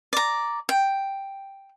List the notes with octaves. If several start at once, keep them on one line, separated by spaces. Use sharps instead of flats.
D5 A#5
G5